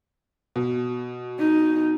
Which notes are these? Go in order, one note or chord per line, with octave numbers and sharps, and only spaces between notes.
B2
D#4